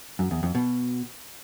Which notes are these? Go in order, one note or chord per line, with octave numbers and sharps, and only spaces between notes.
F#2
E2
F2
B2